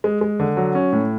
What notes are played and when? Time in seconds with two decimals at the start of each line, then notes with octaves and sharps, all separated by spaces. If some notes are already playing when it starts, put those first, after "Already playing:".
0.04 G#3
0.21 G#3
0.39 D3
0.57 F#3
0.75 C#4
0.92 A2